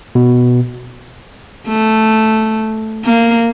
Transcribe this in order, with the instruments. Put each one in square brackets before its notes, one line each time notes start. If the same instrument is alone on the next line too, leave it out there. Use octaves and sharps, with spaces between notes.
[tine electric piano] B2
[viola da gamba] A3
A#3